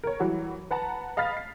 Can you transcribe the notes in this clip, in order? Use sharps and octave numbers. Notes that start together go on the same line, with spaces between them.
A#4 C#5
E3 F#3 G3 F#4
B4 F#5 A5 A#5
D#5 F5 B5 F6 A6 B6
C7